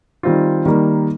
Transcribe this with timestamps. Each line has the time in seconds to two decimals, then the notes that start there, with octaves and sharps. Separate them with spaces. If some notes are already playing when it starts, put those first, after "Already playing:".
0.23 D#3 G3 C4 F4
0.65 D#3 G3 A#3